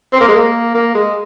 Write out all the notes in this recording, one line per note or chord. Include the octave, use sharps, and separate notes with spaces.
C4
A#3
G#3
A#3
A#3
G#3